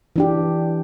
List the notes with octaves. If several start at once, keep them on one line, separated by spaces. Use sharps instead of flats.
E3 D4 G4